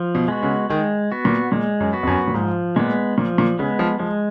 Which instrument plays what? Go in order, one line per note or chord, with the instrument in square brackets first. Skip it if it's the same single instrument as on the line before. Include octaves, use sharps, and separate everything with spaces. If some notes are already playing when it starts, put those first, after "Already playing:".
Already playing: [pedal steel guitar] F3
[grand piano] B2
[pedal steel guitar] G#3 B3 F#4
[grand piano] C#3
[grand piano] D#3 [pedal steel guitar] G#3
[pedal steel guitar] B3 F#4
[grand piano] A#2
[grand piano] A#2 [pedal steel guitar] G#3
[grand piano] F#2
[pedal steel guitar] B3 F#4
[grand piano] F2
F#2
A#2
[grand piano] G#2 [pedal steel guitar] F3
[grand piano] A#2 [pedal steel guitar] G#3 B3
[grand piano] A#2 [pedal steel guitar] F3
[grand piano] A#2
[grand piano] C#3 [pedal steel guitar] G#3 B3
[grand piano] F3
[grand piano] F3 [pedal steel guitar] G#3